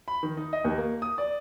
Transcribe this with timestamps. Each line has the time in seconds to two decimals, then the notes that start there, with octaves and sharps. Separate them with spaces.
0.08 B5
0.23 D#3
0.37 D#4
0.53 D#5
0.64 D#2
0.78 A#3
1.02 D#6
1.18 D5